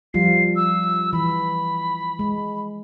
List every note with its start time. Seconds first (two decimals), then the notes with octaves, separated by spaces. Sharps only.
0.14 F3 G3 F4 C7
0.56 E6
1.13 E3 B5
2.19 G#3